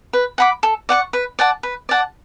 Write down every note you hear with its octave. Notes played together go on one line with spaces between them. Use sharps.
B4
F#5 B5 D6
A4
D5 F#5 C#6
B4
D5 F#5 A5
B4
D5 F#5 A5